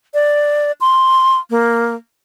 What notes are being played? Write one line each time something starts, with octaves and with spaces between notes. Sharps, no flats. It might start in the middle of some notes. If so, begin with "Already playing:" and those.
D5
C6
A#3